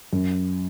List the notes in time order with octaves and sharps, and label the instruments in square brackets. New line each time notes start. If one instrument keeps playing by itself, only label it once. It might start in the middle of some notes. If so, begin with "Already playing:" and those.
[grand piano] F#2